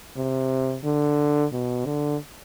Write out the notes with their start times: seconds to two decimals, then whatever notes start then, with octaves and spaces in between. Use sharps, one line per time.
0.17 C3
0.84 D3
1.53 B2
1.86 D3